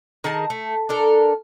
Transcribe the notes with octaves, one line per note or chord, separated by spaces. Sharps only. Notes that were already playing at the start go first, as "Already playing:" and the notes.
D#3 G#4 A#4 A5
A3
D4 A4 A#4